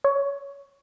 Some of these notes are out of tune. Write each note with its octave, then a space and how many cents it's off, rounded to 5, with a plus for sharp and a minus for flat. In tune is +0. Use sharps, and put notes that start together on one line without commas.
C#5 +15